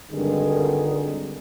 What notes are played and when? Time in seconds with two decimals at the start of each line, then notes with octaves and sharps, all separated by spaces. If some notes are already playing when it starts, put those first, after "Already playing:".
0.12 G#1 G2 D3 D#3 D#4 G#4